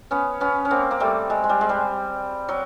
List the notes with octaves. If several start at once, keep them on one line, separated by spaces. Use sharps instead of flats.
B3 C#4
B3 C#4
C#4
A#3 C4
A#3
G3 A3
G#3
G#3
G3
G#3
G3
F#3